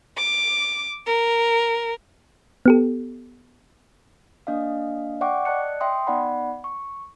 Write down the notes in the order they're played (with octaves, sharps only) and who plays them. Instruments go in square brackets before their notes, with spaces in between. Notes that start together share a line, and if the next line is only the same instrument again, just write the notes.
[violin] D6
A#4
[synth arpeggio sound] B3 G4 A4
[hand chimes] A#3 D4 D#5 F5
D5 E5 F#5 G5 C#6 D6
D5 D#5 A5 F#6 C#7
E5 G5 C6 D#6
B3 D#4 D5 F#5 B5
C#6